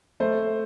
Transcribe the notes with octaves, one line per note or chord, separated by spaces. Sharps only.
A3 C5